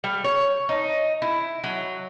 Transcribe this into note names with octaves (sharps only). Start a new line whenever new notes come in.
G3
C#5
D#4
E4
F#3